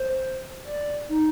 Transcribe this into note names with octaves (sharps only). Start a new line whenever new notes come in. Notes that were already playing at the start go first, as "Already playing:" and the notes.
Already playing: C5
D5
D#4